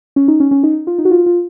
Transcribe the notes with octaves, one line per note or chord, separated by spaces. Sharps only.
C#4
D#4
C#4
C#4
D#4
F4
D#4
F#4
F4
F4